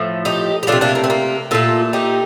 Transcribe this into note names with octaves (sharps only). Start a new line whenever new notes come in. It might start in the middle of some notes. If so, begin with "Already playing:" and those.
Already playing: A2 F3 A3
D#4 G4
G4
F3 A3 D4 F4
C3
A#3 D4
A#3
C4
A#3
A#2 A3 F4 A4
D#4 G4